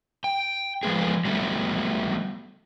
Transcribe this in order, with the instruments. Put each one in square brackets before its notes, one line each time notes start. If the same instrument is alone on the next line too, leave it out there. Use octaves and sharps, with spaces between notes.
[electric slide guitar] G5
F3 G#3 B3 G#4
F#3 G3 A3 B3